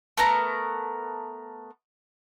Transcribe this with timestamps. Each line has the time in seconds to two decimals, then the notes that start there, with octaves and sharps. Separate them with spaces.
0.17 A3 B3 A#4 A#5